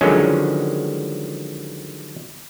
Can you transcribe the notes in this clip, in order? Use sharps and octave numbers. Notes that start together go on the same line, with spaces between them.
D3 D#3 F3 F#3 G#3 C#4